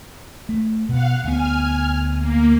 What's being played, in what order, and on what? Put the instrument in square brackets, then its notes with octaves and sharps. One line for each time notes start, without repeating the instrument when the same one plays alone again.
[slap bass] A3
[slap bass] B2 [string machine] F5 F#5
[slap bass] D2 B3 [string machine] G#5 F6
[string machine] A#3